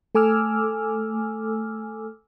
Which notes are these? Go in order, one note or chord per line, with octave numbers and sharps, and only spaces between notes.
A3 A4 G#5 D6 E6 F6